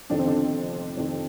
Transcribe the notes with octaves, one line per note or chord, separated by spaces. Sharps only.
F2 C3 D#3 D4
C4
D3 D4
F2 C3 D#3